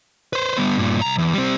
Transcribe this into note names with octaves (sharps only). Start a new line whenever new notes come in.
B4 C5
G3 B3
G2 A#2
C2 A#5
E2
G3 C4